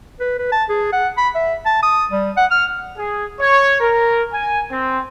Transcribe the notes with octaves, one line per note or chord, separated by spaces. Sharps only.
B4
B4
A5
G#4
F#5
B5
E5
A5
D#6
G3
F#5
F6
G#4
C#5
A#4
G#5
C4